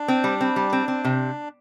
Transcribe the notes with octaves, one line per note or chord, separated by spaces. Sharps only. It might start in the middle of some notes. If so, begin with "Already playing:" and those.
Already playing: D4
C4
G3
C4
G3
C4
C4
C3